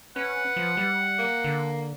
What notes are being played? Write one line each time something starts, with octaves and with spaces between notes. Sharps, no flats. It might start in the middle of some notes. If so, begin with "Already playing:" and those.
C#4 B4 F#5
F3
G3
A#3
D3